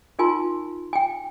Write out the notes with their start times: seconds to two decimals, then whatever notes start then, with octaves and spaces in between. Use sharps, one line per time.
0.19 D#4 F4 A#4 G#5 A5 C6
0.93 G5 G#5